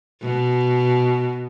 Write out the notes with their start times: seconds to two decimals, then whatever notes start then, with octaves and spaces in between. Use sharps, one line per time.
0.21 B2